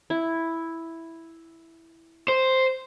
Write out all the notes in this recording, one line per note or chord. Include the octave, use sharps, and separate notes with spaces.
E4
C5